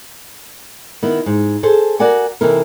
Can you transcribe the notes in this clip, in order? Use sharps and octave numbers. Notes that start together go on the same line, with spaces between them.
D#3 B3 E4
G#2
G#4 A4 C5
F#4 A#4 D5 F#5 G#5
C3 E3 D#4 E4 A4 A#4